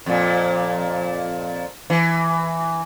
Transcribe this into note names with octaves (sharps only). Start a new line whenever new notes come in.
F2 A#2
E3